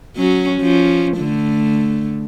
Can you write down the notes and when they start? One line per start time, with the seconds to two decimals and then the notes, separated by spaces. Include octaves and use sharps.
0.16 F#3 C#4 F#4
0.60 F3 C#4
1.18 D3 A3